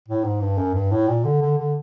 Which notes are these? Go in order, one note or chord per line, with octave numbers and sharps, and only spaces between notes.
A2
G#2
G2
F#2
G2
A2
A#2
D3
D3
D3